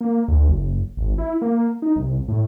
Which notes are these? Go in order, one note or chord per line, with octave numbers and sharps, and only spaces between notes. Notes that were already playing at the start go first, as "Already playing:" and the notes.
A#3
D2
F#1
G#1
E4
A#3
D#4
C2
A2